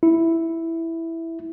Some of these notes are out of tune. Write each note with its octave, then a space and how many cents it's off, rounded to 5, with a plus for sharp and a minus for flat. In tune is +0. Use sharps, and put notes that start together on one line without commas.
E4 +0